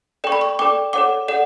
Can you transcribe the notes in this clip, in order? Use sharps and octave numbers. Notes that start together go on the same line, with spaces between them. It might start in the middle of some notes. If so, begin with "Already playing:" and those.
A4 D5 G5 C#6
B5
C#6
A4 D5 G5 D6
A4 C#5 F#5 D6
A4 D5 F#5